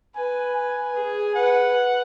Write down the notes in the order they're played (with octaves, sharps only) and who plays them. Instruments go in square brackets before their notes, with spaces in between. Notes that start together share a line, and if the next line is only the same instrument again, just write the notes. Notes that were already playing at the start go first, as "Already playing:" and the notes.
[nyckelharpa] B4 [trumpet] G#5
[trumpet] G#5
[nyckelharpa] G#4
[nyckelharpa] B4 [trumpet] F#5